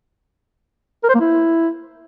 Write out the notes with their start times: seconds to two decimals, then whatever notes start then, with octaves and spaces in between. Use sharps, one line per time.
1.03 A#4
1.09 C5
1.15 A#3
1.20 E4